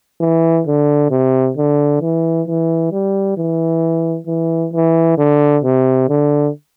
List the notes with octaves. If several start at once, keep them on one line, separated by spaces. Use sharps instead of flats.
E3
D3
C3
D3
E3
E3
G3
E3
E3
E3
D3
C3
D3